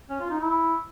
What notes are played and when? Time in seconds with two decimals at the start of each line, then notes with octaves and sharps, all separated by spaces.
0.10 C#4
0.20 F4
0.31 D#4
0.41 E4